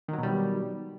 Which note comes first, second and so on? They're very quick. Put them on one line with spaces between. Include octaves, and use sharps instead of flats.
D#3 F#3 B2 G3